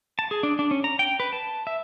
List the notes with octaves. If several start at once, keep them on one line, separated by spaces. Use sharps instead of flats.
A5
G#4
D4
D4
C#4
A#5
G5
B4
A5
E5